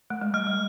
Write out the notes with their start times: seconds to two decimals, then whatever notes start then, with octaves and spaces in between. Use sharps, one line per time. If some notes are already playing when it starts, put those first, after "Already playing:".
0.10 A3
0.21 G#3
0.34 G3 F6
0.47 G3
0.53 G#3